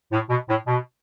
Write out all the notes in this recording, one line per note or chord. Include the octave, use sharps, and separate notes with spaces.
A2
B2
A2
B2